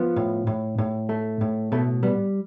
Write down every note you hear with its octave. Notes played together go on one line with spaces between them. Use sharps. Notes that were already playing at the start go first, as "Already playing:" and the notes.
Already playing: F3 B3
A2
A2
A2
A3
A2
B2 A3
G3 B3